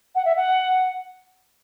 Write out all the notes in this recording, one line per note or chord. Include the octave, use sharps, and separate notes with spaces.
F#5
E5
F#5